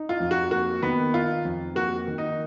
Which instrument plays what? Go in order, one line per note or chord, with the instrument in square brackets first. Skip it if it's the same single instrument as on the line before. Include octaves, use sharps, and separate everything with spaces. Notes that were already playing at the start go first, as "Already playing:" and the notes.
Already playing: [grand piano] D#4
[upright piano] F4
[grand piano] F2
[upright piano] F#4
[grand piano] A#3 [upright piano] F#4
[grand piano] D#3 [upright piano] B3
[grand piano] D#4 [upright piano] F4
[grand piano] F2
[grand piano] A#3 [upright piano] F#4
[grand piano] D#3
[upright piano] D#4